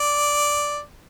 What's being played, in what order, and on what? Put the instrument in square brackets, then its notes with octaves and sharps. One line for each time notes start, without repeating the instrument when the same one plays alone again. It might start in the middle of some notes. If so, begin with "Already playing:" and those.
Already playing: [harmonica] D5